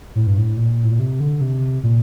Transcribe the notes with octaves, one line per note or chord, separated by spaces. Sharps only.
A2
G2
A2
A#2
A2
A#2
C3
D3
C3
A#2